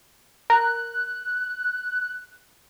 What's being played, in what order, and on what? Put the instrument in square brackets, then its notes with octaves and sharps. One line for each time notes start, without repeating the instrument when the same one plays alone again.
[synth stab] A#4 [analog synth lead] F#6